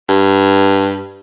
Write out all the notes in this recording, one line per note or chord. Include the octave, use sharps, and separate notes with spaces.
G2